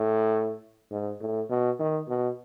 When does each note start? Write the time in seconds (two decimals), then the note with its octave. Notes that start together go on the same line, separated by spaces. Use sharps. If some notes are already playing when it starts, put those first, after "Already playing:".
Already playing: A2
0.91 G#2
1.21 A2
1.50 B2
1.79 D#3
2.08 B2